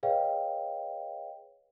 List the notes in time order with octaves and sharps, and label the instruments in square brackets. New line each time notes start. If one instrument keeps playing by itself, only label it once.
[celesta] G#4 B4 C#5 D#5 F5 G5